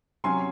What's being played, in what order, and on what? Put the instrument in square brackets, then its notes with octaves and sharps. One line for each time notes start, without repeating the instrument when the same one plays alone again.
[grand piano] C3 F#3 C#4 G#5 C6